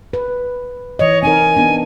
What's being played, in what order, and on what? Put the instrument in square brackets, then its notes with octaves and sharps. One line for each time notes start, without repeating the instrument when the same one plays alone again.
[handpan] B4
[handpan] E3 D#5 [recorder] C#5
[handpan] C4 D#4 A#4 [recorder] G#5
[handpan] B3 D4